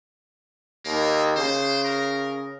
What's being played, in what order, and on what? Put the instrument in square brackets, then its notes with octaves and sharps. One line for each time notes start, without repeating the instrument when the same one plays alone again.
[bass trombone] D#2 [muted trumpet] A#3
[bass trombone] C#3 [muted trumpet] C5
[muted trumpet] A#4